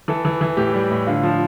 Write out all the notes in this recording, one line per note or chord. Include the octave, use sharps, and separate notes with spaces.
E3 A4
E3
E3
A2 G4
G3
A2
D3 F4
F3